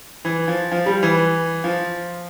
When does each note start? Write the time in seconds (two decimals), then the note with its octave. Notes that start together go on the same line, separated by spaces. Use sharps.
0.25 E3
0.48 F3
0.72 F3
0.86 G3
1.03 E3
1.64 F3